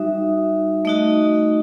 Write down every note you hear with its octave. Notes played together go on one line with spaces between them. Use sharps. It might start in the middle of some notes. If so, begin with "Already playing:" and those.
Already playing: G3 D#4 F#4 E5
A3 D#4 F#4 D#5